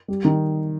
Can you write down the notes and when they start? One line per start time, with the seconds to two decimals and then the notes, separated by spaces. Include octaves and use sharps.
0.08 G3
0.25 D#3